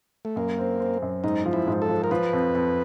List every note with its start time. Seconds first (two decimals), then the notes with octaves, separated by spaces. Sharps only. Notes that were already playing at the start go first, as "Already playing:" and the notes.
0.25 A3
0.36 F#2 A#3
0.59 C4
0.80 C4
1.02 F#2
1.24 G#2 D#4
1.46 F3
1.53 E4
1.68 G#2
1.82 A4
1.89 F3
2.04 A#4
2.11 F3 B4
2.33 F2
2.55 F2